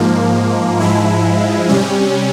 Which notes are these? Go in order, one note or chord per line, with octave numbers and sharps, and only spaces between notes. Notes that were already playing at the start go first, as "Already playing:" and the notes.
Already playing: G#2 F3 A#3
G#2 F3 G#3 E4
C3 G3 C#4